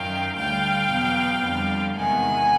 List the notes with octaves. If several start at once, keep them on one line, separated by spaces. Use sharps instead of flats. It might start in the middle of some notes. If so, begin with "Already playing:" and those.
Already playing: F#2 D#3 F#3 F5 G5
D2 D3 G3 F5 G5
E2 B2 F#3 B3
F2 D3 G3
E2 C3 D#3 G#3 B3 F#5 G#5